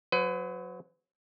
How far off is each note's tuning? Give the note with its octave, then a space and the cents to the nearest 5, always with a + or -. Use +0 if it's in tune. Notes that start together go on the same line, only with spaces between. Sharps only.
F#3 -20 B4 +40